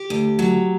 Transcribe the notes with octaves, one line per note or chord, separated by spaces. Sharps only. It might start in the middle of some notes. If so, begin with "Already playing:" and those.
Already playing: G4
D2
F#3